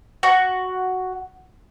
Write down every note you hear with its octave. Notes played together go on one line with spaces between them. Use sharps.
F#4 C#6